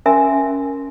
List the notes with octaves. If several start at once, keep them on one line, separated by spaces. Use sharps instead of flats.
C#4 A#4 E5 G#5 C6